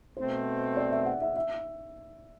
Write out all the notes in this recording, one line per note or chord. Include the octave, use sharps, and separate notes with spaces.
B2 A3 C4 C5
D5
E5
F#5
E5
E5